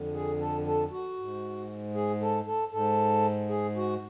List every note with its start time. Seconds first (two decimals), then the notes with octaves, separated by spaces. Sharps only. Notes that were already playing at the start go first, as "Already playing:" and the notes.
Already playing: F2 D3
0.14 G#4
0.39 A4
0.66 A4
0.91 F#4
1.17 G#2
1.94 G#4
2.21 A4
2.46 A4
2.72 G#2 A4
3.49 G#4
3.76 F#4